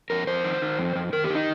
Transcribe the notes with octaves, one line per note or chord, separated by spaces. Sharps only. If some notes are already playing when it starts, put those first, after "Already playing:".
F2 A#4
F2 C5
D#3
D#3
F2
F2
D#3 A#4
G4
D#3
D#4